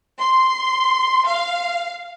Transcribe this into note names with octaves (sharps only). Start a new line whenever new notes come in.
C6
F5